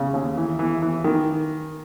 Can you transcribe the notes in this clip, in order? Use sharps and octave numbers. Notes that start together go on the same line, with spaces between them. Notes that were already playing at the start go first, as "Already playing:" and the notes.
Already playing: C#3
D#2
E3
E3
E3
D#3